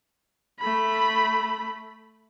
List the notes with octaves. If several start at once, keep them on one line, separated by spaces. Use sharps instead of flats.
A3 B5